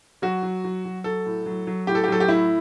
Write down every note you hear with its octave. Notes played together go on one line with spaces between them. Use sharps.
F#3 F#4
F#3
F#3
F#3
F#3 A4
A2
F#3
F#3
A2 G4
A4
G4
F#3 A4
G4
A2 E4